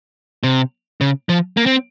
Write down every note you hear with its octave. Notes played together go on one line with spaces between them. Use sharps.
C3
C#3
F3
A#3
C4